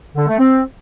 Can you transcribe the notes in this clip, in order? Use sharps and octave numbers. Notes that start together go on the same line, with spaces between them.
D3
A3
C4